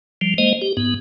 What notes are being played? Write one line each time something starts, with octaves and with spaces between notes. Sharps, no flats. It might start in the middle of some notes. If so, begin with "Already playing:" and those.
F3 G3
G#3 A#3 C5 D#5
G4
G#2 B3